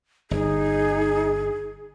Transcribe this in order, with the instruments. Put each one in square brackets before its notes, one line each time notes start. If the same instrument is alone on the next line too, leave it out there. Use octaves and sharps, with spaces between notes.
[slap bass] G1 [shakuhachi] D#4 [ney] G#4